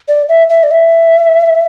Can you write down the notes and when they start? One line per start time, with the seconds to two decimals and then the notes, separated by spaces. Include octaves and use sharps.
0.08 D5
0.29 E5
0.50 E5
0.63 D5
0.71 E5